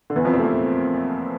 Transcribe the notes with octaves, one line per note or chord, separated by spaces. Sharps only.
D3
E2 E3
F2 F3
C3 C4
A3
A#2 A#3